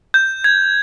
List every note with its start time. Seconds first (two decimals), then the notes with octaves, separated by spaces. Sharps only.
0.14 G6
0.44 G#6